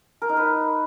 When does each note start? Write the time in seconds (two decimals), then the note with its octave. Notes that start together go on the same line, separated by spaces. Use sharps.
0.22 A#4
0.29 D#4
0.37 B4